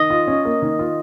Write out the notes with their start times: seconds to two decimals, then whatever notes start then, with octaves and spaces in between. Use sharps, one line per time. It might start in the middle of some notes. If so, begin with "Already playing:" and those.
Already playing: D#3 D#5
0.10 F4
0.28 C#4
0.45 A#3
0.62 D#3
0.79 F4